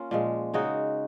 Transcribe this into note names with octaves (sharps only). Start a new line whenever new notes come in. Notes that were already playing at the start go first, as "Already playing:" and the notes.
Already playing: A#3 C#4 F4
A#2 F3 G#3
C#3 G#3 D#4 F#4